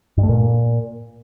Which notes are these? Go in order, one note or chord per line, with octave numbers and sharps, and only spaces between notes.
G2
A3
A#2